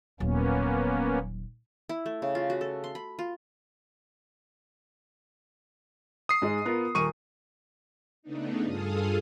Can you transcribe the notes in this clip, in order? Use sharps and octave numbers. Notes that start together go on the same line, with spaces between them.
D#1 F#3 A#3 B3 C#4
E4
A3
C#3
F4
F#4
A4
C6
B5
F4
D#6 C7
G#2 G#3
B3 F4 A#4
D#1 A#4 C#6 D#7
C#3 A3 B3 D4 D#4
G2 F4 G#4 A4 F5 D#6